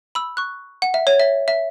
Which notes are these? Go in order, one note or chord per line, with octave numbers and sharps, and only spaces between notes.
B5 E6
C#6 F#6
F#5
E5
C#5
E5
E5